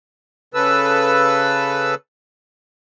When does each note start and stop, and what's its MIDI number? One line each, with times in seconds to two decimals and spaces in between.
0.54 1.95 49
0.54 1.95 69
0.54 1.95 71
0.54 1.95 88